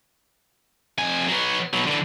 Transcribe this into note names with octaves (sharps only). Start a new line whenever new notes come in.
F2 G#5
F#3 B3
B2 F#3
D3 E3